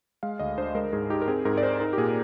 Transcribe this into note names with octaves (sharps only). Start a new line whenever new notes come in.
G#3 F5
D2 D#5
D4 C5
G#3 A#4
G#2 G#4
D#4 G4
A#4
C4 G#4
G#2 A#4
D5
D#4 C5
D#4 A#4
G4
A#2 G#4